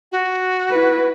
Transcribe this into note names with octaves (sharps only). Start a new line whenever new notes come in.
F#4
E4 B4